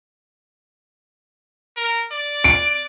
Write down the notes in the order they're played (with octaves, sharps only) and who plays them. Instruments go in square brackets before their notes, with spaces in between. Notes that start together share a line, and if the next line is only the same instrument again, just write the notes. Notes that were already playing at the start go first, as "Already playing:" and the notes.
[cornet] A#4
D5
[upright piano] D7